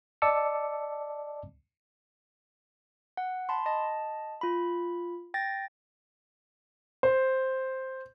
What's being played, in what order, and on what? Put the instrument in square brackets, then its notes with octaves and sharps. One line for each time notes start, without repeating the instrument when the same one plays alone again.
[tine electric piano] D5 D#5 A5 D6 E6 C#7
[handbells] F#5
A5 B5 C6
D#5 A5
F4 B5
G5 A6 A#6
[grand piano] C5